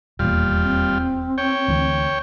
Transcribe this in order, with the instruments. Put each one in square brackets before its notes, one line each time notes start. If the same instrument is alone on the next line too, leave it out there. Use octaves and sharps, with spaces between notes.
[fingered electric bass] D#1 E2 A#2 [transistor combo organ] G3 F4
[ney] C4
[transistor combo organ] C#5 G5
[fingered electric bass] D2 E3